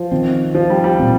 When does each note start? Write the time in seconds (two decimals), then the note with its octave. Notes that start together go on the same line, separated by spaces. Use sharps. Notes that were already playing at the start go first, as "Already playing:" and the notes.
Already playing: F3
0.12 D#3 C4
0.55 F3
0.70 G3
0.84 G3
0.99 A#2 F3 C4